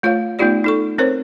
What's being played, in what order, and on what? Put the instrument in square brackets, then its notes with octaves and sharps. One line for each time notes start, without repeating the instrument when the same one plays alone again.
[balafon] A3 F4 C#5 F5
A3 B3 D#4 F4 G4 D5
D#4 A4 C#6
C4 A#4 C5 C#5